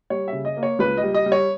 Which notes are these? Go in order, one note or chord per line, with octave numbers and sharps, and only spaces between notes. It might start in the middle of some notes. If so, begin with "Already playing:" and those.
G3 C#5
E5
C#3
D#5
A#3
C#5
C#2 B4
D#5
G3
D#5
G3
C#5